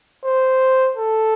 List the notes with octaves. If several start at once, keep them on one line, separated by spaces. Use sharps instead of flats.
C5
A4